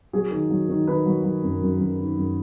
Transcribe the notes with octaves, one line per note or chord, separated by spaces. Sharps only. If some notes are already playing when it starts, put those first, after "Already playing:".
F#3 G#4
D#3
F#3
D#3
D#3 B4
F#3
F#3
F#2
F#2
F#2
D#3
F#2